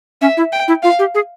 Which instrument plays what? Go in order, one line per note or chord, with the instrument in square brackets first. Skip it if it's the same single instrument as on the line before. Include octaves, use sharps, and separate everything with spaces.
[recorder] C#4 [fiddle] E5
[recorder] E4
[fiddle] G5
[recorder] E4
[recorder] F4 [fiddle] F5
[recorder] G4
G#4